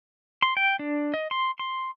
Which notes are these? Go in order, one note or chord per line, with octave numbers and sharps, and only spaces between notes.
C6
G5
D4
D#5
C6
C6